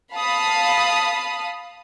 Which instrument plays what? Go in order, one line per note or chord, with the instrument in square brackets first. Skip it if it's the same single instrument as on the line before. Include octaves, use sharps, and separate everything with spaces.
[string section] F5 A5 B5 D#6